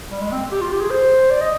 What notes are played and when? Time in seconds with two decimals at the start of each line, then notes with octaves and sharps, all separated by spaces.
0.11 G3
0.21 G#3
0.32 C4
0.51 G4
0.61 F4
0.70 G4
0.81 G#4
0.90 C5
1.30 D5
1.41 D#5